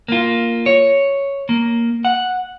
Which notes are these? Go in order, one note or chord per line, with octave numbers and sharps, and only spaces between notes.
A#3 F4
C#5
A#3
F#5